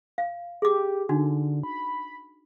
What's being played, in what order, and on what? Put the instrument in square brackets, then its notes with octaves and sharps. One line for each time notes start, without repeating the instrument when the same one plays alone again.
[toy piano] F5
[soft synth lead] G4 [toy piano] G#4 D6
[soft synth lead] D3 [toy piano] D4 D#4 F#4
[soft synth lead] B5